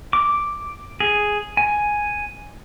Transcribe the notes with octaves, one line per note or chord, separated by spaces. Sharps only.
D6
G#4
G#5